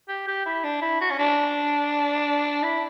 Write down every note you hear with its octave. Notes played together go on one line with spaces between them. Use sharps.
G4
G4
E4
D4
E4
F#4
C#4
D4
E4